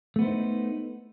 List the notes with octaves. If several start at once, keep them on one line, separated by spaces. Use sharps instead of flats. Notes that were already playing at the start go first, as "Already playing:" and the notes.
A3 B3 D4 D#4 C5